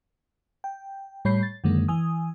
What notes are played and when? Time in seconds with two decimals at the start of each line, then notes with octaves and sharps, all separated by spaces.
0.64 G5
1.25 A2 G3 C#5 B5 G6 C7
1.43 A6
1.64 F#2 D3 D#3 G#3 A#3
1.88 E3 G#5 D#6